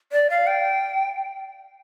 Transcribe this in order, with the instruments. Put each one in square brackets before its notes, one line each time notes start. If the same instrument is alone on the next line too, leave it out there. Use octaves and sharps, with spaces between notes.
[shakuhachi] D5
F5
G5